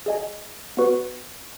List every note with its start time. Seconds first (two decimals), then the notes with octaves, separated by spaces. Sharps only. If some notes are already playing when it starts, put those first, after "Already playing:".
0.06 G#4 D#5 G#5
0.77 B3 F#4 B4